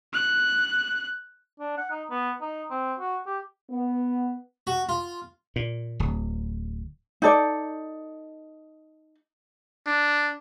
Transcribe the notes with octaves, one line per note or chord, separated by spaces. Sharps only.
F#6
D4
F#5
D#4
B3
D#4
C4
F#4
G4
B3
F#4
F4
A#2
D1
D#4 A4 D5
D4